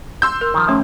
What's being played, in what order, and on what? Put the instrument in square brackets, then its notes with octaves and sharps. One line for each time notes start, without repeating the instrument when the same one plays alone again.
[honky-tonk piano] C6 E6 G6
[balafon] A#4
[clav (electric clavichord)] D#3 F3
[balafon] A3 C#4 C#5